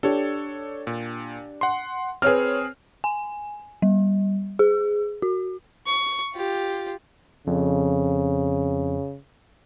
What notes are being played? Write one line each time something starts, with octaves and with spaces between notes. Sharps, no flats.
D4 G4 A4 C#5
A#2
F#5 C6
C4 G#4 B4 C#5 F6
G#5
G3
G#4
F#4
C#6
F4 G4
F2 C#3